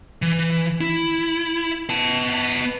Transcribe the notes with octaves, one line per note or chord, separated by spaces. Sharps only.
E3
E4
B3 A5